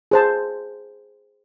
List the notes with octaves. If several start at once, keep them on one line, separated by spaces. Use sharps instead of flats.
G#4 C5 A5